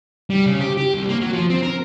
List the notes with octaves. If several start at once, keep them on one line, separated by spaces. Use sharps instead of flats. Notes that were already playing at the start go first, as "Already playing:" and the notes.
G3
C#3
G4
G4
C2
A#3
F#3
F3
C4
A#4